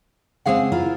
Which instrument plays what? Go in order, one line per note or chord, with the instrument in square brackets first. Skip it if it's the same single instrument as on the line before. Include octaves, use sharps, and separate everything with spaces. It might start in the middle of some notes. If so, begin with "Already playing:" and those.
[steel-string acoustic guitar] C#3 G#3 C4 [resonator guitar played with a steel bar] G#4 F5 F#5
[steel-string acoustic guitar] E4 F4 A#4